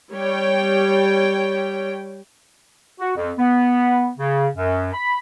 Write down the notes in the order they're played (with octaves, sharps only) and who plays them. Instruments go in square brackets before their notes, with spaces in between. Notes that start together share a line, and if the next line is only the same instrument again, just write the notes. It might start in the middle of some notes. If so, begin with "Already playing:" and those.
[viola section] G3 C#5 G5
[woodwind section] F#4
F2
B3
C#3
F#2
B5